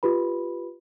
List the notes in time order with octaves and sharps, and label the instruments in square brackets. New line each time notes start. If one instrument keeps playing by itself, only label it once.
[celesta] F4 G4 B4 B5